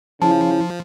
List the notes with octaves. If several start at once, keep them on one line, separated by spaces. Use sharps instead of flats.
C#3 F3 E4 A5